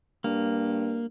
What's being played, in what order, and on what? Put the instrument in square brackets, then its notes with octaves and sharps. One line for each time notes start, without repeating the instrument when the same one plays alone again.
[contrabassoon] G2 [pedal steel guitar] A#3